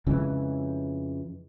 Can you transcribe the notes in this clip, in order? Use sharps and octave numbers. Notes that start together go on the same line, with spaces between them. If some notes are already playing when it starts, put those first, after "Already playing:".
F2 C#3 E3 G#3